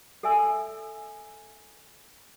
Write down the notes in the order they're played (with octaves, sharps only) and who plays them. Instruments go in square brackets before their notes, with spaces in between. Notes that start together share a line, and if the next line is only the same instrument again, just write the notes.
[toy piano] A4 D5 E5 G#5 E6